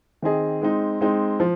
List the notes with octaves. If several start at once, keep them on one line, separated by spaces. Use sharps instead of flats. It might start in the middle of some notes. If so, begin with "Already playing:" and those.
D#3 C4 G#4 D#5
G#3 C4 D#4
G#3 C4 D#4
F3